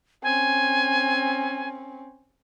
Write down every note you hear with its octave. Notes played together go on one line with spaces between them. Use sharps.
C4 C#4 G#5